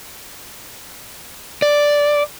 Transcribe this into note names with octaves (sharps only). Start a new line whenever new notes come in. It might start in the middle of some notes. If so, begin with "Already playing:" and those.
D5